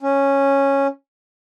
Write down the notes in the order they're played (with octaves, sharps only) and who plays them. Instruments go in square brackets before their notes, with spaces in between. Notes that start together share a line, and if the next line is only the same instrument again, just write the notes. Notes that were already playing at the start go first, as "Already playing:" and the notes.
[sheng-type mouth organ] C#4